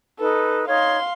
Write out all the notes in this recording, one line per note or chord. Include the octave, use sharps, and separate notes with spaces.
D#4 A4 B4
D#4 C#5 F5 C6